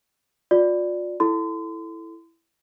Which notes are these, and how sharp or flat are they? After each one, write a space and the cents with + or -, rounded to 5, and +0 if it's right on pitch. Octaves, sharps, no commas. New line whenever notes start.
F4 +40 D5 +0
E4 +0 A4 +0 C6 -35